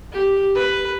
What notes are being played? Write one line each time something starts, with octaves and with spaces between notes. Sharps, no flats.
G4
B4